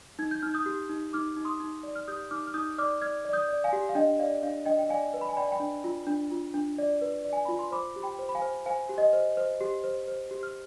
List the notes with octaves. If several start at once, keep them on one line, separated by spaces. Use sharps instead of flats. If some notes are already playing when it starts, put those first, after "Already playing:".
D#4 G#6
G6
D#4 F6
D#6 G6
G4
D#4
D#4 D6 F6
D#4
C6 D#6
D#4
D5
F6
G4 D#6 G6
D#4 D6 F6
F6
D#4 D#6 G6
D5 D6 F6
D5 F6 G#6
D5
D#6 G6
D5
F5 G#5
G4
F5
D4 D#5 G5
D5 F5
D4 F5
D4 D#5 G5
G5
D5 F5 G#5
B4
B5
G#5
D5 G5 B5
G5 B5
D4
F4
D4
F4
D4
D5
B4
D5
G#5
F4 B5
C6
C5 B5 D6
G4
G5 B5
C5
B5
F5 G#5
C5
C5 F5 G#5
G4
D#5
C5
C5
G4
C5
C5
G4
F6